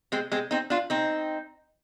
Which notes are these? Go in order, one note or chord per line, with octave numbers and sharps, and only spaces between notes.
G#3 C4
G#3 C4
C4 D#4
D4 F4
C4 D#4